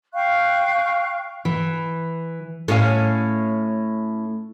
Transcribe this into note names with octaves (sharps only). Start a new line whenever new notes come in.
F5 G5 C#6 F#6
E3
A2 C#4 F5